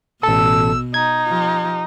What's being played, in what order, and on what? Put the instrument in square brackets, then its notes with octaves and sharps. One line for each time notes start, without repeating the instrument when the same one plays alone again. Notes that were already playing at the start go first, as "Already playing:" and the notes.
[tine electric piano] A1 A4 [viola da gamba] B2 [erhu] E6
[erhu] D#4 [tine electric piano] G#6
[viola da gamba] F3 G4